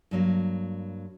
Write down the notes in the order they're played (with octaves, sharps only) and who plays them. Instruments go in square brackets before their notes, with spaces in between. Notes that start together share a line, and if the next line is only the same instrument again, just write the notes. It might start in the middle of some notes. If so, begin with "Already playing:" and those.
[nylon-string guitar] G2 F#3 A#3